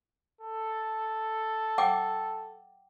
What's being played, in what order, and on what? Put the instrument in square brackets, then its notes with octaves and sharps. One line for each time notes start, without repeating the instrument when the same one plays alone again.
[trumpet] A4
[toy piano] F#5 G5 D6